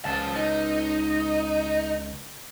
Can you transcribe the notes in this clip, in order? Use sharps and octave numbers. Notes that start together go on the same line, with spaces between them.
C#2 C5 A5
D#4